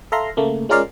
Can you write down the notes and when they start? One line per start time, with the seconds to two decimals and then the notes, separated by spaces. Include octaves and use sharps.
0.12 A4 E5 F5 A#5 C6
0.37 C#3 A3 A#3
0.69 G#3 C#4 F4 A#4 D5 F5